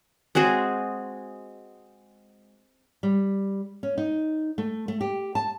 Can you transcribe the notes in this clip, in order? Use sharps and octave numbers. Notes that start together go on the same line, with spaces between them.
G#3 C4 F#4 G#4
G3
C#4
D#4
A3
A3
G4
A5